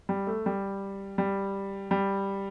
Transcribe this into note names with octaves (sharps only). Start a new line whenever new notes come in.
G3
A3
G3
G3
G3